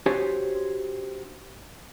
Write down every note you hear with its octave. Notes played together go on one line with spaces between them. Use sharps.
D4 F#4 G4 C5 C#5 G#5